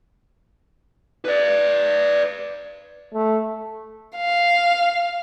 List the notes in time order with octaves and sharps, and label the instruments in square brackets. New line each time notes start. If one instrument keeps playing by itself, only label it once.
[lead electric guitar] B4 D5
[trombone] A3
[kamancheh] F5